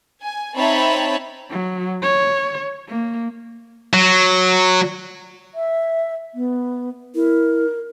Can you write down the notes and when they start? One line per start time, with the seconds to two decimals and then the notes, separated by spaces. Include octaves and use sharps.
0.24 G#5
0.56 C4 D#4 C#5 E5 A5 B5
1.50 F#3
2.02 C#5
2.88 A#3
3.94 F#3
5.55 E5
6.35 B3
7.15 E4 A#4